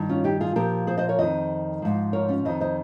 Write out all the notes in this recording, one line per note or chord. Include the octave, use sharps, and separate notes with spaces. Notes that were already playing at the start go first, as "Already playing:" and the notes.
Already playing: G2 D#3
C#4 F4
D#4 G4
F4 G#4
A#2 F3 G4 A#4
G#4 C5
C5 D#5
A#4 C#5
F2 D#3 C5 D#5
G#2 F3
A#4 C#5
C#4 F4
F2 D#3 C5 D#5
C5 D#5